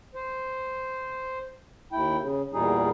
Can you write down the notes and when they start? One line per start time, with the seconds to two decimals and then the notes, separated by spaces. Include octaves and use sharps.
0.15 C5
1.92 D#2 E4 G5
2.21 C#3
2.53 E2 A#2 G3 D#4 G#4